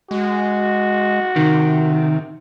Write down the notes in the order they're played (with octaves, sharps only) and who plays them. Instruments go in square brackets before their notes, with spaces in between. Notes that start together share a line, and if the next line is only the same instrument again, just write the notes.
[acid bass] G#3 [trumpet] F#4
[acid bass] C3 [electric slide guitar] D#3